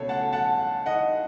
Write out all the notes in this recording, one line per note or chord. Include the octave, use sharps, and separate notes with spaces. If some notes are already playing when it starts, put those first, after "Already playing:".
Already playing: C#2 B2 A3 C#4 A4 C#5
F#5 A5
F#5 A5
D#5 F#5